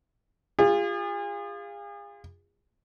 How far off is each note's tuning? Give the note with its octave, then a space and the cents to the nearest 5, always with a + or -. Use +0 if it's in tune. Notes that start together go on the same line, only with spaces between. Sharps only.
F4 +0 G#4 -40